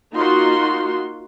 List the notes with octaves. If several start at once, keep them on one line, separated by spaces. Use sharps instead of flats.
A#3 D#4 F4 F#4 C6